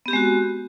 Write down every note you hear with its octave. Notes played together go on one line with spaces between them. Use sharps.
G#3 B3 C4 F#4 G4